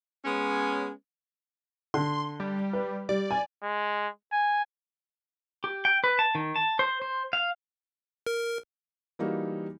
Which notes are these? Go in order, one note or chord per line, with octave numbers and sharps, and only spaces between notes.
G#3 B3 C#4
D3 C6
G3
B4
G3 D5
G#5
G#3
G#5
G4
G5
B4
A5
D#3
A5
C5
C5
F5
A#4
E3 G3 A#3 D#4 F#4